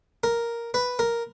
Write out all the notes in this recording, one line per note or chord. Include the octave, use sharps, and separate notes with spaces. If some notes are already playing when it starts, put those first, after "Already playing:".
A#4
B4
A#4